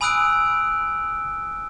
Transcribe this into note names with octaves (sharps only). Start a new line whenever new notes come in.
G#5 B5 D#6 E6 F#6 D7